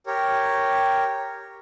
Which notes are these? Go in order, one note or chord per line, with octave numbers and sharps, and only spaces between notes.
G4 A#4 C#5